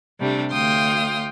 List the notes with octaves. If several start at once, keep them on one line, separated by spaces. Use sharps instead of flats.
C3 G3 A3 D4
D2 F5 G5 C6 D#6